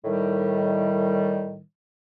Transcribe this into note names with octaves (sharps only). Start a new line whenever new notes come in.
A2 D#3 G3